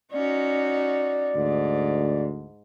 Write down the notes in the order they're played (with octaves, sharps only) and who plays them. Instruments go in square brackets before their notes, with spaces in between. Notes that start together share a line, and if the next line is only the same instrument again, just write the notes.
[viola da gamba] C#4 D#4 F#4 [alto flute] D5
[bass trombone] D2 [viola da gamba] G#2